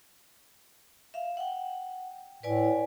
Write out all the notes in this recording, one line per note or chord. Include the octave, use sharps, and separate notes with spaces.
E5 F5
F#5 G5
A2 B4 D5 G#5